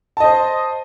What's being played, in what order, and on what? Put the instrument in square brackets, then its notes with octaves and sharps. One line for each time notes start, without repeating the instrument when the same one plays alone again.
[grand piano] A5
D#5
C5